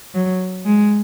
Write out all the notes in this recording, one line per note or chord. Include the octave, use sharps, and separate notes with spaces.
F#3
G#3